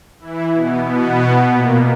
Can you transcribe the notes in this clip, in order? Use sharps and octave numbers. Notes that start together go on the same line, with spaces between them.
E3 E4
B2 B3
B2 B3
A#2 A#3